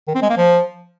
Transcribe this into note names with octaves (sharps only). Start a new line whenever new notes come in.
D#3
C4
G#3
A#3
F3